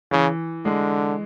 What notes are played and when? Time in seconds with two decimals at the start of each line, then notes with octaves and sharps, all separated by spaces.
0.11 C#3 E3
0.65 D3 G#3